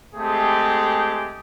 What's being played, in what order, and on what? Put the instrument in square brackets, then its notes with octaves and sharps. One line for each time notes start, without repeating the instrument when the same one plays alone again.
[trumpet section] G#3 A3 C4 G4 G#4